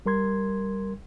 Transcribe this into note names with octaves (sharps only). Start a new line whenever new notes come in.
G3 A#4 C6 G#6